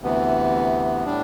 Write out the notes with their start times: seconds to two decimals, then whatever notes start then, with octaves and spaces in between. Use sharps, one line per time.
0.01 D2 C3 E3 B3
1.05 A2 G3 D4